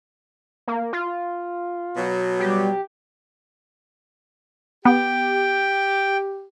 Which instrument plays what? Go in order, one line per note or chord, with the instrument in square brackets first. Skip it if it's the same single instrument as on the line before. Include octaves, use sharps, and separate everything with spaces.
[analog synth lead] A#3
F4
[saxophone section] B2 F#3
[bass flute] G3 [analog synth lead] G4
[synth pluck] B3 [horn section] G4 [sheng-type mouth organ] G5